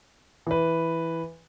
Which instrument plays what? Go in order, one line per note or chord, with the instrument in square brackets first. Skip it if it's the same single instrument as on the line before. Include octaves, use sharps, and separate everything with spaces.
[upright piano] E3 B4